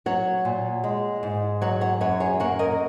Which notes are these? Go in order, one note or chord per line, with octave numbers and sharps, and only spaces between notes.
F#3 C#5 F#5
A#2
G#3
G#2
F#3 C#5 F#5
C#5 F#5
F#2 C#5 F#5
G#4 C#5
A#3 C#5 F#5
A#4 D#5